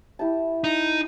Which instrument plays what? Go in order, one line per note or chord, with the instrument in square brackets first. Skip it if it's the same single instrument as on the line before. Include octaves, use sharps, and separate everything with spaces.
[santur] E4 G4 A5
[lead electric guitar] D#4